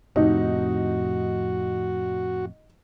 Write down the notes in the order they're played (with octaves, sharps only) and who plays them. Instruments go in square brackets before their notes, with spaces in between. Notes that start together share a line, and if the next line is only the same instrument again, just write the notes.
[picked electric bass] F2 A2 C3 [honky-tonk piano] D#4 [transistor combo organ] F#4